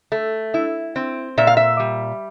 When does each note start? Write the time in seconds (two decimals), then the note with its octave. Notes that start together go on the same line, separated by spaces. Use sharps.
0.12 A3
0.54 E4
0.96 C4
1.38 A#2 E5
1.47 F5
1.57 E5
1.80 G3